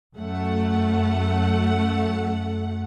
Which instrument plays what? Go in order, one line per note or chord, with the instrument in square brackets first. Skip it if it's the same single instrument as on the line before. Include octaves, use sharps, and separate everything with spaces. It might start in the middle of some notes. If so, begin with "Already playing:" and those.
[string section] F#2 A3 F#5